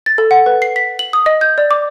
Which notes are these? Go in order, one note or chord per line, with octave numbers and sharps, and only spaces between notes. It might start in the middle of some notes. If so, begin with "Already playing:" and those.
A6
A4
F#5
B4
C7
B6
F#7
D#6
D#5
G6
D5
D6